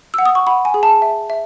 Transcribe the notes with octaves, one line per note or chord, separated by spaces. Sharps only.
F#5 E6
D#6
C#6
F#5 B5
G#5
G#4
A5
E5
E5